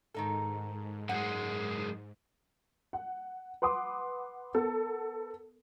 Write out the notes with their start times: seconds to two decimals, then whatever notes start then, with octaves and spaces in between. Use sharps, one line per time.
0.14 G#2 D#3 D#4 A4
1.09 F#2 G#3 F#5
2.93 F#5
3.62 B4 F#5 C6 D6 D#6
4.54 B3 A4 A#4